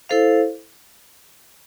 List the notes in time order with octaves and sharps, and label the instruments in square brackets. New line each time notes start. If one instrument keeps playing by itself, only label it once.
[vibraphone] E4 A4 C5 F5